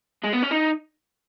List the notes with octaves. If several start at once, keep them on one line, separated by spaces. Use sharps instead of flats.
G#3
B3
C#4
D#4